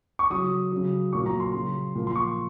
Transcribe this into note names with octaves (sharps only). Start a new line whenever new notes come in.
C#6
C#3 F#3 D#6
C#3 F#3
A#2 F#3 C#6
A#5
C6
C#3 F#3
A#2 F3
C6
C#6